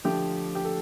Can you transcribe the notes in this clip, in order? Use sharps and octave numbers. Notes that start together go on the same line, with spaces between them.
D3 F3 A3 G4
G4
A4